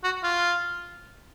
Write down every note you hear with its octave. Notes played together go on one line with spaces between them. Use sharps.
F#4
F4